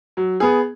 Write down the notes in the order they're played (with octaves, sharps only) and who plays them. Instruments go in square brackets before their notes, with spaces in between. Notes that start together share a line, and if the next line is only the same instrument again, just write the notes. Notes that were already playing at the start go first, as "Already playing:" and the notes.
[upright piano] F#3
B3 G#4